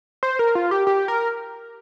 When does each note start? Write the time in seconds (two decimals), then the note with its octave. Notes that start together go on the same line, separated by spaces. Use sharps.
0.23 C5
0.39 A#4
0.55 F4
0.71 G4
0.87 G4
1.08 A#4